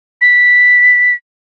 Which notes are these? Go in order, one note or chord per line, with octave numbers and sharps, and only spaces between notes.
B6